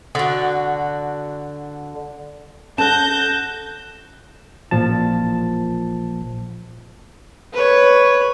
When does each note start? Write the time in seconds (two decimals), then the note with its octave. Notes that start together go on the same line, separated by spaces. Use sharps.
0.15 D3 F#4
2.78 C#4 A4 F#5 A5 F#6 G6 A#6 E7
4.71 A1 A#2 F3 A5
7.53 B4 C#5